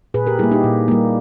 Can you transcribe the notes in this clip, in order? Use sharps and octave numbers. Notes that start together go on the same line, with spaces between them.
A#2 G#4 B4
G4 A#4
G3 A#3 E4 G#4
D#4 G4
A#2
G3 A#3